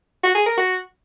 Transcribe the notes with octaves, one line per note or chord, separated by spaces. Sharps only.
F#4
G#4
A#4
F#4